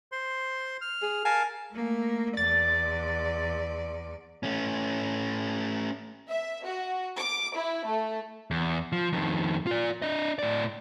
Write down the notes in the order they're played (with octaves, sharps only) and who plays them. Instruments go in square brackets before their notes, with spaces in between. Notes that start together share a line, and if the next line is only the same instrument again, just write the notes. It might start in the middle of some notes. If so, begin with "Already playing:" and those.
[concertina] C5 C6
F6
[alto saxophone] G#4
[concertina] A#4 F5 A5 [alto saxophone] G#5
[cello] A3 A#3
[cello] E2 D5 [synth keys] A6
[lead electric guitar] A3 C#4
[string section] E5
F#4
D6
E4
A3
[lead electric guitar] E2
F3
F2 D#3
F4 D5
D4 D#5
A2 D5